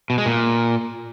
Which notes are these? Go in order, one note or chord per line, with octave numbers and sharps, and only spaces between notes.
B2
G#3
A#2